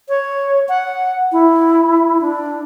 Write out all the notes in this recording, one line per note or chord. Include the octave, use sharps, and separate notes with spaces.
C#5
F#5
E4
D4